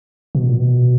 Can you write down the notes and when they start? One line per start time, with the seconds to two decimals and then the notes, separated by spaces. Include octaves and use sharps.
0.35 B2
0.46 A#2
0.57 B2